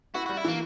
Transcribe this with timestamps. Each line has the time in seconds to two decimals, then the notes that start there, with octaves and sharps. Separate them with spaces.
0.14 E4 F#4
0.26 G3 F#4
0.37 E4
0.44 E3 A#3